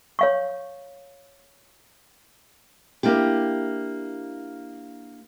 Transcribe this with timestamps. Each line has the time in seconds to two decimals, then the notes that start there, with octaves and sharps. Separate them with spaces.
0.19 C#5 F5 C#6
3.03 A#3 D4 E4 G4